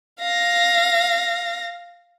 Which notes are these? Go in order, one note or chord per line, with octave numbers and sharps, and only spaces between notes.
F5 A#6